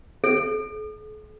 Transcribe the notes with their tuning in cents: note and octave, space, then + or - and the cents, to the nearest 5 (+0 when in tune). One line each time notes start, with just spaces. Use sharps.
A4 -45